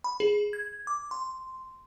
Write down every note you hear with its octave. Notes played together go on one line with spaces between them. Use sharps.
B5
G#4
G#6
D6
C6